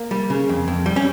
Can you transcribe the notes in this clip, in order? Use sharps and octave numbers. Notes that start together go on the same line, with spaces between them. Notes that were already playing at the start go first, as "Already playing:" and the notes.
Already playing: A#3
G3
C#3
F2
F2
G3
C#4